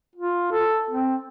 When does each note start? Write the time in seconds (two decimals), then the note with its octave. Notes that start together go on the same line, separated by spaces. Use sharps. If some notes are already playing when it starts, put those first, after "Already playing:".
0.16 F4
0.52 A4
0.91 C4